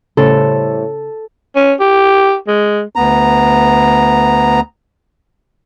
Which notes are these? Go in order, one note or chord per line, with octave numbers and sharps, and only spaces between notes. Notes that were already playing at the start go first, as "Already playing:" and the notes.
A2 C#3 G3 A4 C5
C#4
G4
G#3
D2 B3 A#5